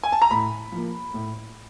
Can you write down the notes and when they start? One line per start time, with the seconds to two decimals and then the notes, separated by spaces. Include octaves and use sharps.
0.03 G#5
0.12 A5
0.22 A#5
0.31 A2 B5
0.72 F3 A#3
1.14 A2